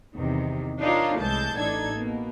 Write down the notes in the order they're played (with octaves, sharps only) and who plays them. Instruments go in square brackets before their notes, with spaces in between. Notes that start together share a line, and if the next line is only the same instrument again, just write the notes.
[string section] E2 C3 D#3
D4 D#4 F4 A#4 C#5
C2 A2 E3 G#3 A5 G6
A1 A2 D4 D#4 A4 G#6
B2 A#3